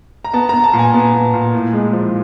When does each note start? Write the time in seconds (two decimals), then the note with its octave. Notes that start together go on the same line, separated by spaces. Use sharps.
0.25 A#5
0.34 B3 A5
0.49 B3 A#5
0.64 A5
0.73 A#2
0.79 G#5
0.94 B3
1.13 A#2
1.34 A#2
1.54 A2
1.73 G#3
1.93 F3